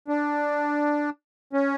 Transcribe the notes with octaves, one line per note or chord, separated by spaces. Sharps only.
D4
C#4